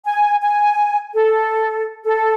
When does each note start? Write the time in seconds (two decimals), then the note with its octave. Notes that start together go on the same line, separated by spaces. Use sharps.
0.05 G#5
0.42 G#5
1.13 A4
2.03 A4